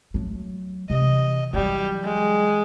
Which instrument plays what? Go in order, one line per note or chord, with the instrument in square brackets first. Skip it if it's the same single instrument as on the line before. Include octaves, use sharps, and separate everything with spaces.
[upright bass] F#3 A3
[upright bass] C3 E3 [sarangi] D#5
[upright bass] E3 F#3 [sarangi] G3
[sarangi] G#3